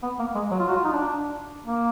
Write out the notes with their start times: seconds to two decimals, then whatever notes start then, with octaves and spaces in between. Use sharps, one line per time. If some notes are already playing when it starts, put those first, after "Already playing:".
0.03 B3
0.19 A#3
0.35 G#3
0.51 F#3
0.59 F4
0.68 F#4
0.76 F4
0.84 D#4
0.92 D4
1.66 A#3